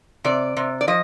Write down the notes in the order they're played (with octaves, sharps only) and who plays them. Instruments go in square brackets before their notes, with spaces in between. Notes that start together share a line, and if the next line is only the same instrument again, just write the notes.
[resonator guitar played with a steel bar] C3 D5
C3
D5
F3 D#5